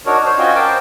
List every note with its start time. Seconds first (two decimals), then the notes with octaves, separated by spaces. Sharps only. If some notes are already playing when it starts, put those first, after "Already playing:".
0.06 D4 D#4 F#4 A#4 C#5
0.25 C5 C#5
0.38 C#4 F4 F#4 D#5 G5 G#5
0.55 A#4 C5 G5 A5 D6